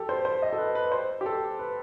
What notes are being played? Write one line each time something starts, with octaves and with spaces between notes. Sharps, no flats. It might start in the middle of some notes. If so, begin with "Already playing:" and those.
Already playing: G4 A4
C5
C5
D#5
A4
B4
B4
C5
G4
A4
B4